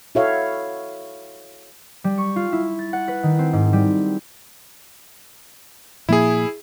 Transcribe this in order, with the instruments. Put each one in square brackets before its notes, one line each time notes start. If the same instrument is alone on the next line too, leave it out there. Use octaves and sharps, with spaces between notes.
[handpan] E4 F#4 A4 C#5 E5 F5
[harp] G3
C#6
F4
E4
A6
F#5
B4
D#3
C4
G#2
G3
[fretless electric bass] A#2 F3 A#3 [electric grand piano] E4 G#4